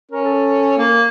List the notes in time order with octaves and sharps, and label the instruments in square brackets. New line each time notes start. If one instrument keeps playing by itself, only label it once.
[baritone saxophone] C#4 [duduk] A#4
[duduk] A4
[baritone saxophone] A#3